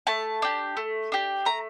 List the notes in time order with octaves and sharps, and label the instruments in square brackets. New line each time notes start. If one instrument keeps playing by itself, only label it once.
[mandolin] A3 A5
D4 G4
A3
D4 G4
A3 A#5